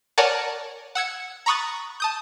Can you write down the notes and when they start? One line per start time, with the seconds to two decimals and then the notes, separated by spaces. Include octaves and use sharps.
0.18 A#4 C#5 D5 F#5 G#5 A5
0.95 F#5 E6 G#6 C#7
1.46 A#5 B5 C#6 D#6 F#6 A6
2.00 A5 D#6 G6